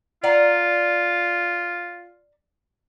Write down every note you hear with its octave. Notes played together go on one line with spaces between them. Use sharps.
F4 D5 F#5 A#5